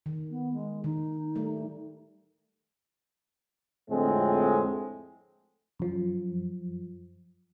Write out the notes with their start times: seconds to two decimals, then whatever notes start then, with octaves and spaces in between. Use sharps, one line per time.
0.06 D#3
0.30 B3
0.53 G#3
0.84 D#3 D#4
1.35 G3 A3
3.90 F2 A2 D3 G#3 C4
5.80 F#2 F3